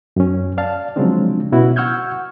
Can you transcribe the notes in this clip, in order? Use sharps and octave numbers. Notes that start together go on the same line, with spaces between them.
F#2 C#4
D5 F5 A5
C#3 F3 F#3 G#3 C4 D4
B2 C#4 E4 F#4
F#5 C#6 E6 F6 G6 G#6